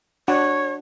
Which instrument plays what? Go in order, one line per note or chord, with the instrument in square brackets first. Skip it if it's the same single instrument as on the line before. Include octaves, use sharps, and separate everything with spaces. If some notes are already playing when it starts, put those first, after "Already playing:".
[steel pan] D4 F#4 F#5 [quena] C#5